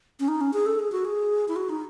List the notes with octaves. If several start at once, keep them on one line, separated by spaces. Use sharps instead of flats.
C#4
D#4
C#4
G#4
A4
G#4
F#4
G#4
E4
F#4
D#4